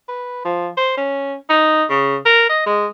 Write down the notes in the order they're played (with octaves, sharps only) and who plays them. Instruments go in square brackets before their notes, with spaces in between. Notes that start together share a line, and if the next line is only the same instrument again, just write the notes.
[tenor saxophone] B4
F3
C5
C#4
D#4
C#3
A#4
D#5
G#3